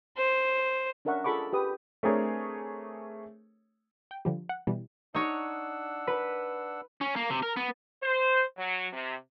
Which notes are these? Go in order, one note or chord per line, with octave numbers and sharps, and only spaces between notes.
C5
C#4 D4 A#4 E5 F#5 C#6
F4 G#4 A4 B5 C#6 D6
G4 B4 D#6
A3 C4 D4 G#4 A#4 C#5
G5
D3 F3 G3
F#5
B2 E3 G3
D4 D#4 C#5 F#5 E6
B4
C#4
A#3
C3
A#4
B3
C5
F#3
C3